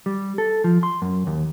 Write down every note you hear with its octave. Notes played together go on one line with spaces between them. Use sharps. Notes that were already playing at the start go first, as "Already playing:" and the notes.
G3
A4
F3
C6
F#2
D#2